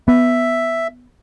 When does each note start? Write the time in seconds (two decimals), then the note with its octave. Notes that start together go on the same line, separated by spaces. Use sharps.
0.08 B3 E5